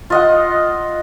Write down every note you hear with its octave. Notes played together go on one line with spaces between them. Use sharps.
F4 D#5 F#5